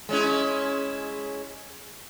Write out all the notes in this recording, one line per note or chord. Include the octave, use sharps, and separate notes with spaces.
G#3 C#4 E4